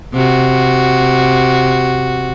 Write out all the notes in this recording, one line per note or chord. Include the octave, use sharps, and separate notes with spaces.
C3 F#4